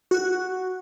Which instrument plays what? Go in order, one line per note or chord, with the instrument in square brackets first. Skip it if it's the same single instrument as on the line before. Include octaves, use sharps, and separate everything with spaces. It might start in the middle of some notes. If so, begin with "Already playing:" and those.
[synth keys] F#4